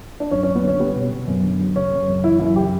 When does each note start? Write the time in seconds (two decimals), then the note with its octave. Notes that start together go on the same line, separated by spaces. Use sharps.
0.20 D4
0.31 F#2 C#4
0.43 C#4
0.47 F#2
0.55 B3
0.63 D3 C#4
0.79 G3 B3
0.96 B2
1.11 B2
1.27 F#2
1.43 D3
1.60 F#3
1.76 C#3 C#4
1.92 F#2
2.08 F#2
2.24 E3 E4
2.40 F#2 E4
2.56 C#3 G4